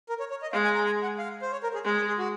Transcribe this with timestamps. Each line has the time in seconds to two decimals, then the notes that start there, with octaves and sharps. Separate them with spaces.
0.09 A#4
0.20 C#5
0.30 C#5
0.42 D#5
0.52 G#3 F5
0.64 G#5
0.74 A#5
0.86 G#5
1.03 F#5
1.19 F5
1.42 C5
1.52 C#5
1.63 A#4
1.74 G#4
1.85 G#3 G#4
1.96 G#4
2.08 G#4
2.18 F#4